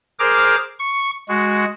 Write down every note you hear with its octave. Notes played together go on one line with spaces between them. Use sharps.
G#4 A#4 C5 D6 F6
C#6
G#3 F#4